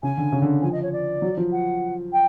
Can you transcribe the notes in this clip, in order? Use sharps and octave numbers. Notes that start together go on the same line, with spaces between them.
C#3 G#5
D3
C#3
D3
F3 G#5
D#5
C#5
D5
F#3
F3
F#5
G5